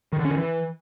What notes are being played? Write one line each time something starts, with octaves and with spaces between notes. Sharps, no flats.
D#3
D3
C#4
D#3
E3